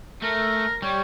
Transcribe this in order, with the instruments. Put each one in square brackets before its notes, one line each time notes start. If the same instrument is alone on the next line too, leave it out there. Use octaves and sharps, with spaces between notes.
[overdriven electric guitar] A3 [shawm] A#4
[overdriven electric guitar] G3 [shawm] C#5